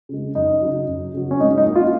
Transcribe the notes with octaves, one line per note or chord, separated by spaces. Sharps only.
C#3 G#3
F#2 D#4
C#3 F#3
F#2
C#3 F#3
C#4
G#2 D#4
D#4
F#3 A#3
F4